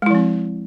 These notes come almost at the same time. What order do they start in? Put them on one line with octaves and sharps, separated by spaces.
G#3 E4 F3 C4